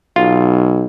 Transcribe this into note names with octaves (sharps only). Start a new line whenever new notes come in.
B1 F4